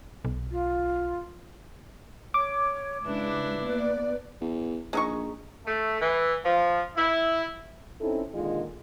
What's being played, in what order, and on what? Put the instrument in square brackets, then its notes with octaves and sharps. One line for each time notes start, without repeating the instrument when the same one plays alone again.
[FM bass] B1
[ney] F4
[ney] C#5 [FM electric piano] D6
[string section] C#2 [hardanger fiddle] D4 E4 [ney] B4
[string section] A#3 B3 D5
[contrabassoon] E2
[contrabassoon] A#1 [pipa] G#3 D#4 C#6
[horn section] A3
E3
F3
E4
[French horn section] C4 C#4 D#4 E4 A4
A#2 D3 D#3 G#3 D#4 F4